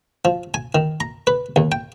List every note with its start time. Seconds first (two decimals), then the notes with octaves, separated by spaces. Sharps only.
0.25 F3
0.54 G#5
0.75 D#3
1.00 A#5
1.27 B4
1.56 D#2
1.72 G5